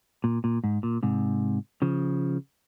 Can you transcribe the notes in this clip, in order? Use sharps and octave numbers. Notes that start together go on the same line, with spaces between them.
A#2
A#2
G#2
A#2
G#2 C3
C#3 F3